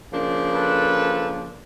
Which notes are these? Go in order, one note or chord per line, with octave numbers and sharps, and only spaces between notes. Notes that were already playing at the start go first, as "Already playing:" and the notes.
C#3 F3 A#3 D4
A4 B4